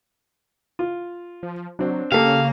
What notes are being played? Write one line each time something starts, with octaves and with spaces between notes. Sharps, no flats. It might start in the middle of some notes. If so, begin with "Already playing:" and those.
F4
F3
F#3 C4 D4
C#3 A#3 G4 A4 F5